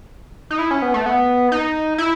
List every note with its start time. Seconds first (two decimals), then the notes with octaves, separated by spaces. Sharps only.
0.50 D#4
0.59 E4
0.71 C#4
0.82 B3
0.94 A3
1.06 B3
1.52 D#4
1.98 E4